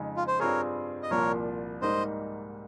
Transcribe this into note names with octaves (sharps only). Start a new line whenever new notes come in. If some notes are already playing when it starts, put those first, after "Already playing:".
Already playing: F2 C#3 G#3 D#4
F4
C5
G2 G3 C4 F4 G#4 A#4 C#5
D#5
C2 A#2 F3 A#3 F4 A#4 C#5
G#2 G3 A#3 D#4 C5 D#5